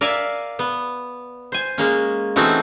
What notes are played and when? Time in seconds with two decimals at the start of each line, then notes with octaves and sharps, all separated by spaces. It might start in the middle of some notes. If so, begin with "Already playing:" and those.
0.01 A#4 D5 E5 F5 G#5
0.59 B3
1.52 C5 G#5
1.78 G#3 A#3 C#4
2.36 E3 A3 C4 C#4 D#4 F#4